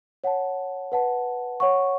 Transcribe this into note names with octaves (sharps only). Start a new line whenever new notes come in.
C#5 F#5 A5
B4 F#5 A5
C#5 F#5 C#6